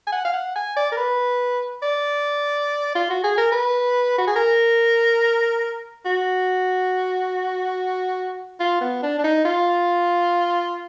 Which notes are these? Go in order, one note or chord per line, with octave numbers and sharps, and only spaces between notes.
G#5
F#5
F5
F#5
G#5
D5
A#4
B4
D5
F4
F#4
G#4
A#4
B4
F#4
G#4
A#4
F#4
F4
B3
D4
D4
D#4
F4